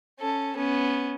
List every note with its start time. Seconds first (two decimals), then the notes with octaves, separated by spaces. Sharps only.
0.19 C#4 A4
0.57 B3 C#4